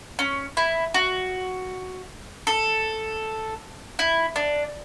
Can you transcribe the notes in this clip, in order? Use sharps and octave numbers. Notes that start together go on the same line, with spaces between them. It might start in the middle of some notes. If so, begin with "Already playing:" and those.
C#4
E4
F#4
A4
E4
D4